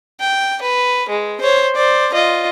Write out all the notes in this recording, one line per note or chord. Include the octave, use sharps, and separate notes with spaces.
G5
B4
G#3
C5 C#5
C5 D5
F4 D#5